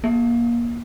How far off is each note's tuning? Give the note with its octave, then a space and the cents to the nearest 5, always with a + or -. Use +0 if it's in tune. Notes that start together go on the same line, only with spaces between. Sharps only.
A#3 +25